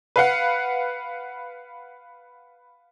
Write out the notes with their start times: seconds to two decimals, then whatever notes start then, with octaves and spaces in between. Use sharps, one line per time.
0.16 B4 F5 F#5